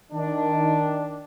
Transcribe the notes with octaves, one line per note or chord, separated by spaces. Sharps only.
D#3 D4